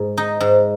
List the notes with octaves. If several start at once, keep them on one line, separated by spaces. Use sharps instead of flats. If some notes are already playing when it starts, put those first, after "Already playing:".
Already playing: G#2
D#4
G#2